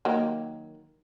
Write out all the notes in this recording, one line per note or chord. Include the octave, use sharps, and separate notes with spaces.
D#3 F#3 A#3